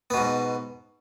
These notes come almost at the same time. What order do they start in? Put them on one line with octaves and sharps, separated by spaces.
B3 B2 G#2